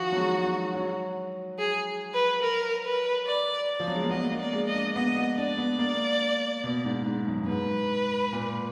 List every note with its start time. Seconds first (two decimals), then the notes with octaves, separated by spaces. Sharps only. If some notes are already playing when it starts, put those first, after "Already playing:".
Already playing: D#3 F3 F#4
0.12 F#3
0.17 G#3
0.39 G#3
0.47 F#3
0.74 F#3
1.58 G#4
2.14 B4
2.42 A#4
2.85 B4
3.27 D5
3.69 D5
3.80 F3
3.87 F#3
3.95 G#3
4.03 A#3
4.10 B3 D#5
4.31 A#3
4.40 D5
4.53 G#3
4.67 D#5
4.74 D4
4.95 B3 D#5
5.17 B3
5.37 D4 D5
5.58 B3
5.79 A#3
6.64 B2
6.85 G#2
7.06 G#2
7.27 F#2
7.43 F#2
7.48 G#2 B4
8.33 A#2